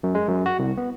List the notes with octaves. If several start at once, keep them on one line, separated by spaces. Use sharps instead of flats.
F#2
G#3
F#2
F#4
C2
B3